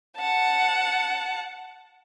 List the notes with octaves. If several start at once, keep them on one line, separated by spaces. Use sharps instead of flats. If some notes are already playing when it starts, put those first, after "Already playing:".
F#5 A5